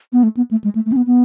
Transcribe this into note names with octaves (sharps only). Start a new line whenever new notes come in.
B3
A3
B3
A3
G#3
A3
A3
C#4
B3
B3